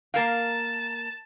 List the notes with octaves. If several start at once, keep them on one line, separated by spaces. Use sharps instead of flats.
A#3 A#4 F5 A5